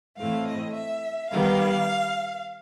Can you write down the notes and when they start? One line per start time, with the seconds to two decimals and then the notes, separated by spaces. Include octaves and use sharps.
0.18 A2 E3 A3 C4 F5
0.47 D#5
0.74 E5
1.31 D#3 G3 B3 F5